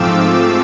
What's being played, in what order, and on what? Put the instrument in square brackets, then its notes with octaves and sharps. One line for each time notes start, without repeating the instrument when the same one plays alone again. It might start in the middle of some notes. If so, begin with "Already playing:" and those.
Already playing: [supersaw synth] G#2 F3 A3 C4 F4 D6 E6